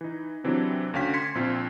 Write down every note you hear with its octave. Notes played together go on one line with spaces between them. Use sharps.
E3 D#4
C3 E3 F#3 C4 D4
D2 C#4 F#4 F5 G5 B6
C6 G#6 B6 C#7
A#1 C4 F4